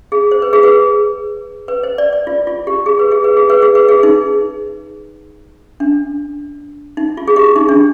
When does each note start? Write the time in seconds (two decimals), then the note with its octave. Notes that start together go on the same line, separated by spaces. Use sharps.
0.12 G#4
0.31 C5
0.42 B4
0.53 G#4
0.63 B4
1.68 B4
1.83 C5
1.98 D5
2.13 D5
2.27 F4
2.47 F4
2.67 G4
2.86 G#4
2.99 B4
3.12 G#4
3.24 B4
3.37 G#4
3.50 B4
3.62 G#4
3.75 B4
3.89 G#4
4.03 D#4
5.80 D4
6.97 D#4
7.17 F4
7.28 G#4
7.36 G4
7.56 D#4
7.69 D4